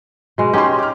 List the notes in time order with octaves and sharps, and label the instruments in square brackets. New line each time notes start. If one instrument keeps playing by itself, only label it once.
[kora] B2 G#3
[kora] C#4 D#4 G4 [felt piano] D#5 C6
[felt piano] D6 F6